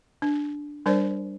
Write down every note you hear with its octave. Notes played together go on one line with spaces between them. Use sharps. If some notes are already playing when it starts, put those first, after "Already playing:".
D4
G3 D4 A#4 C5 D5